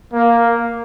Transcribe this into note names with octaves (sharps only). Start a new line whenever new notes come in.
A#3